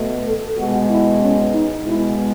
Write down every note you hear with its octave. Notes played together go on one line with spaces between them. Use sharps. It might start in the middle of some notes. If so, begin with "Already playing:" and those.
Already playing: B2 A3
A4
B2 G#3 F#4
E4
C#4
D#4
B2 G#3 E4